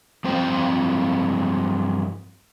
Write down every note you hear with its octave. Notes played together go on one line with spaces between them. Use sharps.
G2 F3 C4 C5 G5